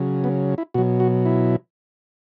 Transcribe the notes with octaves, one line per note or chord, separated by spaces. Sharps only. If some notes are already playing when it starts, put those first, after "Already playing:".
Already playing: C#3 F#3
B3
E4
B2 F#3 F#4
F#4
E4